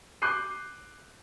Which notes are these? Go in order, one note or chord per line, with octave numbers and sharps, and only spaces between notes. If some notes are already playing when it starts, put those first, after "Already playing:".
D6 F#6 G6 C7 D#7